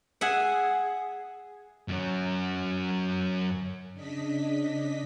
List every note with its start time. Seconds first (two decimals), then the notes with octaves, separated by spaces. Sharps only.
0.21 G#4 E5 F#5
1.88 F#2 F#3
3.94 C#3 D4 D#5 B6